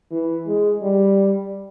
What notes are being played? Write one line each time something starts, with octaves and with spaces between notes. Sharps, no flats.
E3
G#3
G3